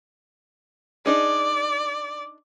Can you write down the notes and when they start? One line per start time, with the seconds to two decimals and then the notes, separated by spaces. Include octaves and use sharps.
1.06 D4 D#4 G#4 D5